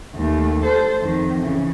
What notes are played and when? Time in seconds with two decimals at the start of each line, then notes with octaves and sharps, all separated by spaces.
0.15 D#2 A3
0.63 A4 C5
1.01 F2 D#3
1.43 C#3 E3